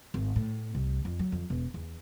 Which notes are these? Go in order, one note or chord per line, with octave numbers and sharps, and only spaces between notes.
G#1
A2
C2
F2
F#3
F2
E1
E2